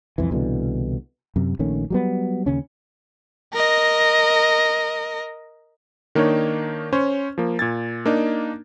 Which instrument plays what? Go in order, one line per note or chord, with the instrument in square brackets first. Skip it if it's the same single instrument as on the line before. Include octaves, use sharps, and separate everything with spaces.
[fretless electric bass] C2 F2 E3
C2 B2 D3 E3
F#2 C3
A#1 D#3 A3 C#4
F#3 G3 B3
D#2 C#3 C#4
[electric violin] A#4 D#5
[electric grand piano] D#3 A#3 D4 D#4 C#5
C#4 C5 C#5
F3 A#3
A#2 G#6 A6
A#3 D4 D#4